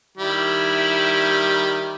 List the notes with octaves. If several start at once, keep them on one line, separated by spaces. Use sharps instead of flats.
D#3 G3 E4